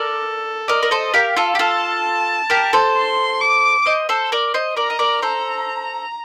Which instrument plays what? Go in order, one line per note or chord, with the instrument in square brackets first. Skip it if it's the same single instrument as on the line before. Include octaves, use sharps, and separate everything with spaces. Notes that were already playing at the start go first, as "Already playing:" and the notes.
Already playing: [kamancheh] A4 [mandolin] A#4 D5
[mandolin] A#4 D5 [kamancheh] D#5
[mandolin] A#4
A4 C5
[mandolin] G4 A#4 [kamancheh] F5
[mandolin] F4 A4
G4
[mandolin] F4 A4 [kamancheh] A5
[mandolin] G4 A#4
A4 C5
[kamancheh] C6
D6
[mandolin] C5 D#5
A4 C5
A#4 D5
C5 D#5
[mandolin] A#4 D5 [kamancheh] A#5
[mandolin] D#5
A#4 D5
[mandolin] A4 C5 [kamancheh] A#5